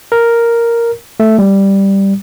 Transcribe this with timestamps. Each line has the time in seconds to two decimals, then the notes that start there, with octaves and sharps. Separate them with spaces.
0.12 A#4
1.20 A3
1.39 G3